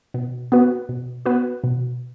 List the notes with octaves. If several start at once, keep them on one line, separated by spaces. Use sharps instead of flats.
B2
B3 F#4 B4
B2
B3 F#4 B4
B2